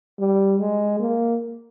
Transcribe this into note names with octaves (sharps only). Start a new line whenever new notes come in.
G3
G#3
A#3